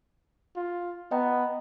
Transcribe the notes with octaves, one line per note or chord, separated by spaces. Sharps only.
F4
B3 D#5 G5 A#5